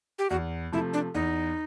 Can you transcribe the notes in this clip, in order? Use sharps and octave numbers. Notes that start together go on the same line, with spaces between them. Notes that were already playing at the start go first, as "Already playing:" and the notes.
G4
E2 F#4
C3 F3 A3 E4
D4
E2 D#4